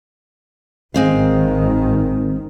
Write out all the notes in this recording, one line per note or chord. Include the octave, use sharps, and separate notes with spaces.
G#1 D#3 G#3 C4 F5